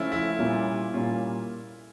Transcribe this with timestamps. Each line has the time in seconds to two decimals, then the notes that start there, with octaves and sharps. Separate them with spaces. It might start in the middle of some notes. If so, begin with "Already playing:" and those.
Already playing: C#3 F3 A3 C#4 E4 F4
0.12 E4
0.39 A#2 G3 A#3 C#4 F4
0.94 A#2 G3 A#3 C#4 F4